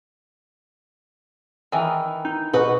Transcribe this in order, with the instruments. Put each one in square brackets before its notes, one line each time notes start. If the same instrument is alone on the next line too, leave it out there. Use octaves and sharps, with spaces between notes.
[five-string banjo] D#3 E3
[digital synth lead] D#4
[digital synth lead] B2 [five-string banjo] F#4 B4